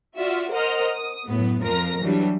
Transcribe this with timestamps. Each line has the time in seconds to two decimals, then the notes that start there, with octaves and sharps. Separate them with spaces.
0.18 F4 F#4 D5 E5
0.51 A#4 C5 D#5 F#5 D#6 F6
0.89 D#6
1.26 F#2 A2 B3
1.62 F2 F3 A#4 A#5 A#6
2.01 E3 F#3 G3 D4